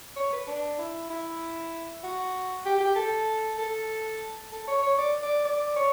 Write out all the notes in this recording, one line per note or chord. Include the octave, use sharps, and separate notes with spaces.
C#5
B4
D4
E4
E4
F#4
G4
G4
A4
A4
A4
C#5
C#5
D5
D5
D5
C#5